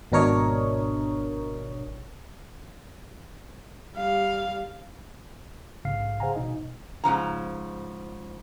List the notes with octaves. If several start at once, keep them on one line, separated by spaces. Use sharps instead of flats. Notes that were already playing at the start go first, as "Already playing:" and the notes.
G#1 B2 D4 A#4 C#5 D#5
G3 F5
A#1 G#2 C#3 F5 F6 C7
G#4 C5 F5 F#5 G#5 A#5
G#1 B2 D#4 D#5
G#2 C#3 F3 A#5